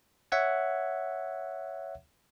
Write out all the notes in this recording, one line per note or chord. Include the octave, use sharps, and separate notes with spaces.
C#5 E5 F#5 G#6